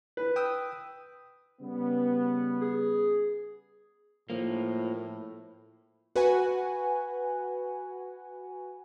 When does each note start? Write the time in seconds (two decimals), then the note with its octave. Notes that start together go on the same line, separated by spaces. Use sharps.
0.17 B4
0.36 G5 D#6 E6
1.61 C#3 G3 B3
2.61 G#4
4.30 A2 F3 A#3
6.16 F#4 B4 F#5 G#5